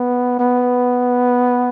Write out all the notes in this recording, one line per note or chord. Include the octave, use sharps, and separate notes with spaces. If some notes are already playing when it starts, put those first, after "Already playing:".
Already playing: B3
B3